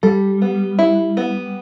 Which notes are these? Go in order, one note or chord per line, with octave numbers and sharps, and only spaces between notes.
G3 A4
B3
E4
B3